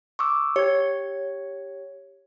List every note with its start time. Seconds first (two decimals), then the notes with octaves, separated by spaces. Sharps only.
0.19 C#6 D6 E6
0.56 G4 C#5 G#6